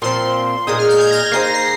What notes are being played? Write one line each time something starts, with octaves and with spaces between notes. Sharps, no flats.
A#2 F3 C4 C6
A#2 G#3 D#4 G#4 D#6
F6
G6
G#6
A#6
A#6
A#3 D#4 G#4 C5 C7
A#6
C7